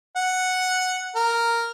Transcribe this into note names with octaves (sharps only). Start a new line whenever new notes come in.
F#5
A#4